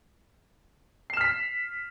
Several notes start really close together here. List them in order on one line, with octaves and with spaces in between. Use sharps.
C7 E7 F6 B6